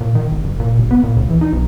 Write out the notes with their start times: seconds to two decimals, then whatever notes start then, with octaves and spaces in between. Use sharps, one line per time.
0.01 A#2
0.15 D#3
0.32 G#1
0.44 F#1
0.60 A#2
0.79 G1
0.91 B3
1.03 A#2
1.17 C#2
1.30 E3
1.41 D#4
1.53 B1